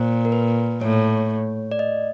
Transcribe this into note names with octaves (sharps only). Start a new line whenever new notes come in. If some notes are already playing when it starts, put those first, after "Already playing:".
Already playing: A#2 C5
A#4
B4
A2 C#5
D5
D#5